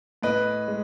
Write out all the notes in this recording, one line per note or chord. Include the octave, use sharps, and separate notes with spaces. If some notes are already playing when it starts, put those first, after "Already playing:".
A2 B4 D#5
G#3